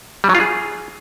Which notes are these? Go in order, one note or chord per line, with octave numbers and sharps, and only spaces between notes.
G3
F#3
F4
G#4